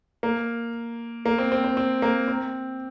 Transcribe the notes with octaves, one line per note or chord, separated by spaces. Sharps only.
A#3
A#3
C4
C4
C4
C4
A#3
C4